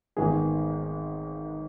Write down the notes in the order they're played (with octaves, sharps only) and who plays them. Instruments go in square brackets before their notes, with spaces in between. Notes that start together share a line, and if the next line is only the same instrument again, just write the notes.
[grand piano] G#1 G#2 D#3 G#3 B3 [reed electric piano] G#4